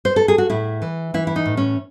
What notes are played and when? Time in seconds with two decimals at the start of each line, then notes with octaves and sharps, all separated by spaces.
0.05 C5
0.16 A4
0.28 G#4
0.38 F#4
0.50 A2 E4
0.82 E3
1.14 E3 E4
1.27 E4
1.36 D#4
1.46 A2
1.57 C#4